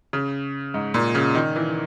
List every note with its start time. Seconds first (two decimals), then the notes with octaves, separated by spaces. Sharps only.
0.13 C#3
0.74 G#2
0.94 A#2
1.15 C#3
1.35 D#3
1.56 E3